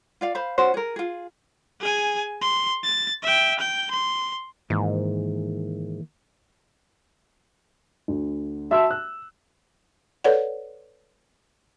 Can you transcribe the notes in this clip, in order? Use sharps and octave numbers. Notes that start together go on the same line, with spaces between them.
F4 D5 F5
C5 F5 B5
C#4 F#4 C5
G#4 A#4
F4 G#4
G#4 G#5
C6
A6
E5 G5
G5 G6
C6
G#2 D#3 E3 A#3
D2
F#4 E5 A5 C6 E6
F#6
A4 B4 C#5 D5 F#5